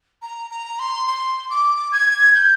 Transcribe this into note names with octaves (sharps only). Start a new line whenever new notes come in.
A#5
A#5
C6
C6
D6
G#6
G6